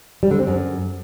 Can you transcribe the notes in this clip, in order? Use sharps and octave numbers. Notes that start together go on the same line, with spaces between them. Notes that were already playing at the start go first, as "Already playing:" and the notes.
G3
D3
C4
F#2